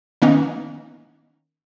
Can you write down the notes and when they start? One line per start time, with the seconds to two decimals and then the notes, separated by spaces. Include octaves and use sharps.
0.22 D#3 E3 A#3 B3 C#4 D#4